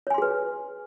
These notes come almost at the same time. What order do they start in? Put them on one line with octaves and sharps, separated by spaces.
C#5 G#5 C6 G#4 B4